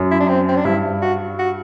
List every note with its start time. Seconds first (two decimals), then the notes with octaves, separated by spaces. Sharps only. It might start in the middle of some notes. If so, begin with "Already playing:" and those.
Already playing: F#2
0.11 E4
0.20 D4
0.29 C4
0.49 C4
0.57 D4
0.65 G2 E4
1.02 F#4
1.39 F#4